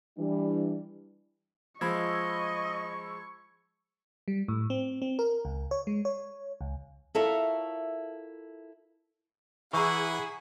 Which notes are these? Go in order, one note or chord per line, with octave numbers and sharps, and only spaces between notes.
E3 G3 D4
F3 G#3 D#5 B5 C#6 E6 G#6
G3
A2
C4
C4
A#4
C#2
C#5
G#3
C#5
C#2
E4 F4 A4 A#4 C#5 E5
E3 E4 G#4 F#5 A#5 C#6